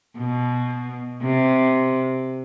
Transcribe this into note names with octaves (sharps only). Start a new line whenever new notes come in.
B2
C3